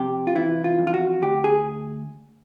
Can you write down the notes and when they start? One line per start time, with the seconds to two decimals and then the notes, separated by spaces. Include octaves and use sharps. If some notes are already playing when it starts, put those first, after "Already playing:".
Already playing: F2 C3 G4
0.27 F4
0.35 E3 E4
0.64 F4
0.79 F2
0.87 F4
0.94 F#4
1.22 D2 G4
1.44 G#4